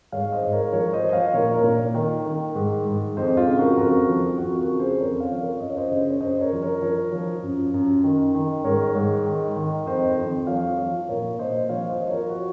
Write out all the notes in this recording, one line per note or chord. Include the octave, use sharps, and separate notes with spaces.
G#2 C#5 F5
C5 D#5
G#2
A#4 C#5
F3 A#4 C#5
C5 D#5
F3 D#5
C#5 F5
A#2 A#4 C#5
A#4 C#5
A#2
D#3
D#3
G#2
G#2
F2 C5 D#5
F4
C#3
F#4 A#4
F2 F#4 A#4
F3
F2 F#4
F#4 A#4
C#3
G#4 C5
F2 A#4 C#5
C#5 F5
F3
A#4 C#5
F#2 D#5
C#5
C5 D#5
C#3
C#5
F#2 C5 D#5
A#4 C#5
F3
A#4 C#5
F3 A#4 C#5
F3
F#2
F#2
D#3
D#3
G#2 A#4 C#5
G#2
D#3
D#3
F2 C5 D#5
F2
F3 C#5 F5
F3
A#2 A#4 C#5
A#2 C5 D#5
F3 C#5 F5
C5 D#5
F3
A#4 C#5
F#4